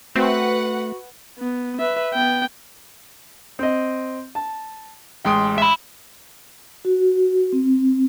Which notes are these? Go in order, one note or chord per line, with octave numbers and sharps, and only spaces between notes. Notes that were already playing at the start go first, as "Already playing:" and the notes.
A3 C4 F#4 B4 F#5
B3
B4 E5
B3 G5
C4 D#5
A5
A1 G#3 G5 C6 D#6 D7
E5 B5
F#4
C4